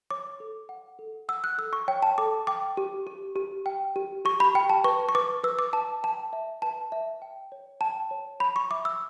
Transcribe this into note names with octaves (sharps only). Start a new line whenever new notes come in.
C#5 D6
A4
F#5
A4
F#5 E6
F#6
A4 E6
C#6
C#5 G5
A5
A4 D6
G5 D6
G4
G4
G4
G5
G4
G4 C#6
B5
G4 G5
A5
B4 C#6
C#6
B4 D6
B4 E6
D6
B4 A5
G5 A5
E5
B4 A5
E5
G5
C#5
G5 A5
C#5
C#5 B5
C#6
E5 D6
E6